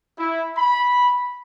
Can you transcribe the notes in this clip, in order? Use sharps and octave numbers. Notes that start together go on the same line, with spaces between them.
E4
B5